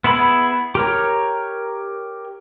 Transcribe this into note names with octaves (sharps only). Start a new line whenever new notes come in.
B3 E4 G#4 B5
G4 A#4 C#5